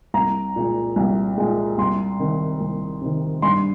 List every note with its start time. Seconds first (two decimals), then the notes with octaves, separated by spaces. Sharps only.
0.14 C2 A#5
0.56 A#2 G#3
0.96 C2
1.38 A#2 G#3
1.78 C2 C6
2.19 C3 D#3
2.61 C2
3.01 C3 D#3
3.42 G2 C6